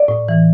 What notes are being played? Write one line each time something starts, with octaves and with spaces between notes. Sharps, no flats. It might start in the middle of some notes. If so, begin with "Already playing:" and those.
Already playing: D5
A2
E3